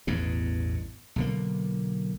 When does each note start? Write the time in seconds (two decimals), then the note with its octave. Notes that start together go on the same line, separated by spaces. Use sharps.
0.07 A1 E2 G2 B2
1.16 B1 D3 A#3